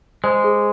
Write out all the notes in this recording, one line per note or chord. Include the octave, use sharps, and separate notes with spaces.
G#3 C5
G#4